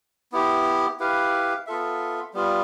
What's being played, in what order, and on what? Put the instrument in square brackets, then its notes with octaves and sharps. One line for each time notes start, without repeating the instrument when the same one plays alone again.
[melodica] B3 E4 G4
E4 G4 B4 F5
B3 F4 A4 E5
G3 B3 F4